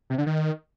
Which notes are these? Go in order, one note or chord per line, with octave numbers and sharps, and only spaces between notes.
C3
D3
D#3